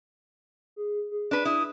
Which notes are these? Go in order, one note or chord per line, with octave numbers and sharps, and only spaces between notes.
G#4
G#4
D4 B4
E4 D#6